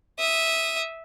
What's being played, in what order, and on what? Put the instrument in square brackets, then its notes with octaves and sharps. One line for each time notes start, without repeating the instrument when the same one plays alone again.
[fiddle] E5 D#6